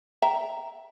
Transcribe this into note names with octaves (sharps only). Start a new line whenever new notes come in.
E5 G5 A#5